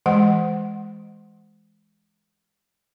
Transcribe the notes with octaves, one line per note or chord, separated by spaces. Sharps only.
E3 G#3 F#5